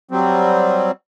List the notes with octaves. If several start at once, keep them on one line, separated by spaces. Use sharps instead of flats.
F#3 G3 C4